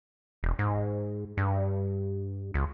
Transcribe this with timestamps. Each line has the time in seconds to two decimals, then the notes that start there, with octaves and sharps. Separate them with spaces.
0.43 E1
0.59 G#2
1.37 G2
2.54 C#2